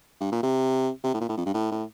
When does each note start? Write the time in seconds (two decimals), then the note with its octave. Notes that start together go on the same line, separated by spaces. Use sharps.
0.21 G2
0.32 A#2
0.43 C3
1.04 C3
1.14 A2
1.20 A#2
1.29 A2
1.37 F2
1.46 G2
1.54 A2
1.71 A2